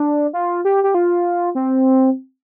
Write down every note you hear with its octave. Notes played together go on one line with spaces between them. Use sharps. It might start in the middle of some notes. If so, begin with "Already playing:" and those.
Already playing: D4
F4
G4
G4
F4
C4